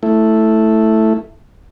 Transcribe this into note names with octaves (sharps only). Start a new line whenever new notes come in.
A3 E4